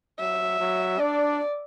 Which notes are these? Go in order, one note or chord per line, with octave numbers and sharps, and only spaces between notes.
F#3 E5
F#3
D4 D5